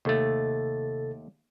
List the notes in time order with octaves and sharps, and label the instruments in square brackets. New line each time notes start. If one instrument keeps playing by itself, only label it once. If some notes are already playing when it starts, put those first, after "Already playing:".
[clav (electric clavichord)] D#2 A3 [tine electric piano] C3 A4 A6